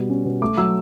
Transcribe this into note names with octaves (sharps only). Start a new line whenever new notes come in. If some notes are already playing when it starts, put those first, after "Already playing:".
Already playing: B2 G3
C#4
B2
A3 D6
F#3 E6